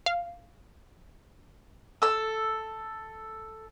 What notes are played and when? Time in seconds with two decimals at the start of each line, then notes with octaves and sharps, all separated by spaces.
0.06 F5
2.02 A4 E6